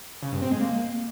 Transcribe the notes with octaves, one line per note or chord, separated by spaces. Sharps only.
C#3
G2
C4
G#3
A#3